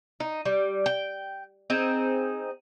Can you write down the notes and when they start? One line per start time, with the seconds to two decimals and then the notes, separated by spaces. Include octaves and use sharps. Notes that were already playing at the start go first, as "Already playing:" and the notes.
0.20 D#4
0.45 G3
0.86 G5
1.70 C4 D#4 G#4